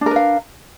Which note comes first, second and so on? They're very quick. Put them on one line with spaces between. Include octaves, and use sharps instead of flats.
D4 A#4 B4 F5